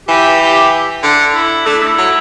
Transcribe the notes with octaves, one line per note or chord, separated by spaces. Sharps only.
E3 G4
G4
D3
E4
A3 D4
E4
D4
E4
F#3